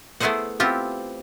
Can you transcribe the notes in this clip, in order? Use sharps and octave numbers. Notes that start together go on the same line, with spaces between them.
A3 B3 E4 G#4 C5 F#5
B3 C4 E4 F4 G4